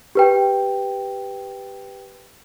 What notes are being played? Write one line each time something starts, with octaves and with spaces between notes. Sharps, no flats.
G4 B4 G5